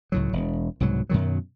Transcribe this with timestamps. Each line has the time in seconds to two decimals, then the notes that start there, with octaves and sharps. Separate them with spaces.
0.12 C#2 A2 F#3
0.33 E1
0.80 C2 G#2 B2 F#3
1.09 F#2 B2 D#3 F#3